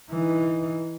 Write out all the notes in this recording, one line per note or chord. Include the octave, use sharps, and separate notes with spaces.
E3 D#4